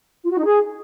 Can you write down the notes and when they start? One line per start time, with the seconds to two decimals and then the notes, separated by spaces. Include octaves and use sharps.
0.25 F4
0.32 F#4
0.39 D#4
0.45 G#4